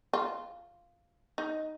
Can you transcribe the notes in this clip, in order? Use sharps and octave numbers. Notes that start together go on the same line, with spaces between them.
F4
D#4